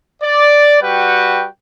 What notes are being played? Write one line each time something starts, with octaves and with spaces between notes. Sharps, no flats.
D5
G3 F#4 B4 F#5 G5